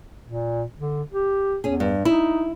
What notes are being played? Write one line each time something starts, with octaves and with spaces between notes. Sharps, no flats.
A#2
D3
G4
E2 C#4 G#4
G2
D#4 E4